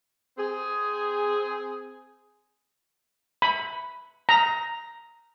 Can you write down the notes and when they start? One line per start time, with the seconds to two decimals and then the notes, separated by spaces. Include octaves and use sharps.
0.38 C4 G#4
3.42 B5
4.29 A#5